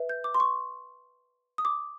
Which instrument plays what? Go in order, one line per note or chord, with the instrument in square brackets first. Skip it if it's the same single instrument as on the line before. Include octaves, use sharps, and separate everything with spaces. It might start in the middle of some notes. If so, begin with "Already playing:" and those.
Already playing: [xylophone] B4 E5
G6
D6
C6
C#6
D#6
D6